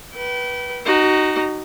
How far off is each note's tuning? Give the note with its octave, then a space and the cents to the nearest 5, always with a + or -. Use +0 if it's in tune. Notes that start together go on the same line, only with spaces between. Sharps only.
B4 -15 G5 -30
D#4 -10 F#4 +25